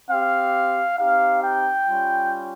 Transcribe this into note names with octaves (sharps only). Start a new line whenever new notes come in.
C4 G4 F5
C4 D#4 G4 F5
G5
G3 C#4 F4